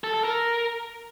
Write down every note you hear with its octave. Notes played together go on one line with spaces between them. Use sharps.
A4
A4
A#4